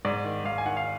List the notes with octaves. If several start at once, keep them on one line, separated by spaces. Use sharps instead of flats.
G#2 D5
D#3
G#2 F5
G#5
D#3 F#5
F5